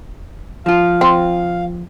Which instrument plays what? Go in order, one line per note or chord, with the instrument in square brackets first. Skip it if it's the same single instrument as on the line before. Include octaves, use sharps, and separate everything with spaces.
[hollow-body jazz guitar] F3 F4 [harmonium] F5
[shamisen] C4